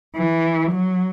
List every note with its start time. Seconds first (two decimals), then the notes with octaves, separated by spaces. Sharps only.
0.16 E3
0.71 F#3